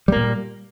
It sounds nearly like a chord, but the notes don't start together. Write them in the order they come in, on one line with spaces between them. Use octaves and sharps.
G3 A#3 A#2